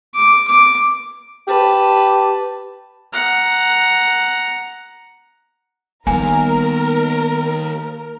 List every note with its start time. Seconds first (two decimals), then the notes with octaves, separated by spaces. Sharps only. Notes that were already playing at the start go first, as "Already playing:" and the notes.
0.14 D6
0.47 D6
1.47 G4 B4 A5
3.13 F#5 A#5
6.07 D#3 G3 A#3 B3 A#4 G#5